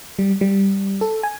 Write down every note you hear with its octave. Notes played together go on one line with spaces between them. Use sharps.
G3
G3
A4
G#5